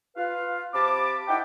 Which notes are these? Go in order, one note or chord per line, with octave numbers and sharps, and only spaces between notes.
F4 B4 F5
C3 C4 A5 B5 D6
D#4 E4 E5 F#5 G5